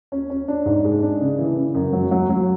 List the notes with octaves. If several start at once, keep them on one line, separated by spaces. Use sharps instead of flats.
C#4
C#4
D4
G#2
G#3
D4
C#3
E3
C#3
F#2
F#3
F#3
F#3